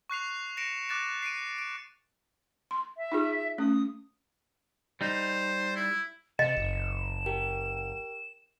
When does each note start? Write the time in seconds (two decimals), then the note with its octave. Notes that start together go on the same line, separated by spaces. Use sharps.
0.10 C#6 F#6 C7 F7
0.57 A#6 C#7 D7 E7
0.89 D6 F#6 A6 E7
1.22 C7 D7 D#7
1.59 D7
2.71 C6
2.97 E5
3.12 D#4 F4 G#4
3.58 A3 C#4 D#6
5.01 G3 D#4 C5
5.76 E4
6.39 C3 D#5 C#7 E7
6.57 F#1
7.26 G4 A#4 G5